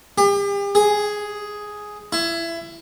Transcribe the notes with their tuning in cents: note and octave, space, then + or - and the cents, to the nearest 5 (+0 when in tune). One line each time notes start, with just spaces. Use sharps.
G4 +40
G#4 +5
E4 +20